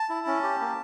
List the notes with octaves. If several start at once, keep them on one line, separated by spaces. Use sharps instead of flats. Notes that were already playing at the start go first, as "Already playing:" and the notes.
Already playing: A5
E4
C#4
G4
A#3